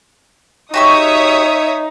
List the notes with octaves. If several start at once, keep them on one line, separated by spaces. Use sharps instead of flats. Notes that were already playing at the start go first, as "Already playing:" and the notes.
D#4 F#4 G4 C#5 E5 C#6 D#6